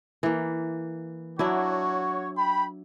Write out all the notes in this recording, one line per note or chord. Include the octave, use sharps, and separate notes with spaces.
E3 A#3
F#3 D4 E4 F#4 C#5
G5 B5